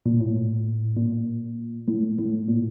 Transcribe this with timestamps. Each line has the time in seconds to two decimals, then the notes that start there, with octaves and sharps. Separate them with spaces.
0.06 A#2
0.20 A2
0.96 A#2
1.88 A2
2.18 A2
2.48 A#2